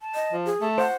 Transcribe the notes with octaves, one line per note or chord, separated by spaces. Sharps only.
A5
D#5
F3
G#4
A3 A5
C5 F#5